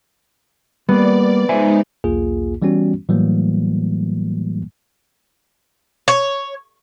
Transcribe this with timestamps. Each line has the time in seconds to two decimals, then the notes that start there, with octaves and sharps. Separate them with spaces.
0.89 G3 A#3 B3 D5
1.49 G#3 D#4 C5 E5 G#5
2.04 B1 E2 A#3 F4 G#4
2.62 E3 G3 B3 C#4 F#4
3.09 A2 E3 F#3 G3 A3 A#3
6.08 C#5